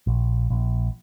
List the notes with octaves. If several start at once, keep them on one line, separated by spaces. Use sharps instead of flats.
A#1
A#1